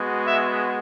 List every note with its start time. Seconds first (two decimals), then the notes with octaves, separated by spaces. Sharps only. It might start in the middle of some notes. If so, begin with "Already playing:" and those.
Already playing: G#3 B3 F#4
0.27 E5